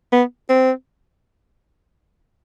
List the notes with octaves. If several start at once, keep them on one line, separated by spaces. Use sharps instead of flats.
B3
C4